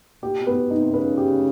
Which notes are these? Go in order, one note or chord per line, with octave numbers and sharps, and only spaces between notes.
A#2 G4
B2
B3
B2
D#4
C3
C#3 B4
G4